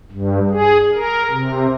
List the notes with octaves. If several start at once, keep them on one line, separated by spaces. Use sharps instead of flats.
G2
G#4
A#4
C3